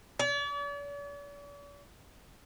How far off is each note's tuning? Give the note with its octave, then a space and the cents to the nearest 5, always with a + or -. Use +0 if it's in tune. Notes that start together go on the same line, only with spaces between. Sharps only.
D5 -45